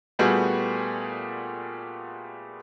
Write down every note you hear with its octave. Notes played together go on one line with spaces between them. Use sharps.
A#2 G3 A3 B3 F#4 G#4